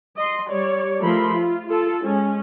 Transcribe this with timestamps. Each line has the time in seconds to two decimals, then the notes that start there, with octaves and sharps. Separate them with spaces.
0.16 D#5 C6
0.50 G3 C#5 D5
1.02 F3 A3 A#4 B5 C6
1.34 F4
1.67 F4 A4
2.02 G#3 C#4